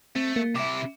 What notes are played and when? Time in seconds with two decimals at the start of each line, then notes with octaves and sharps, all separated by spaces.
0.16 A3 C4
0.36 A#3
0.56 C3 E4 E5 D6